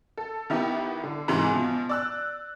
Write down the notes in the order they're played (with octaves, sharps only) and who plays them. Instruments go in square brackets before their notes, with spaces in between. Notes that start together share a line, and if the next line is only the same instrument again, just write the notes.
[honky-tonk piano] A4
D#3 B3 E4 G4
D3
G#2 C3 D#3 E3 G#3
B2 F3
D5 E6 F#6